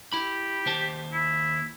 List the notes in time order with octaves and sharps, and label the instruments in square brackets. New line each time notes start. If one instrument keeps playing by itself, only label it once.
[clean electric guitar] E4 B5 [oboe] G4
[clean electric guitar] D#2 C5 A5
[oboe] E4